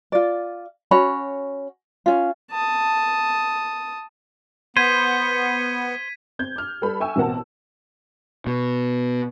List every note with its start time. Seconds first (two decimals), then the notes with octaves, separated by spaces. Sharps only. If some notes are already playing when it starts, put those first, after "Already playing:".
0.12 F4 D5
0.91 C#4 F#4 C#5 B5
2.06 C#4 F4
2.51 A5 D#6
4.77 B3 C5 G#6 B6 D#7
6.39 C4 G6 G#6
6.56 D6 F6
6.82 G3 A4 B4 B5
7.00 E5 G5 G#5 C#6 E6
7.16 A1 B2 C4 A#4 F#5 A5
8.47 B2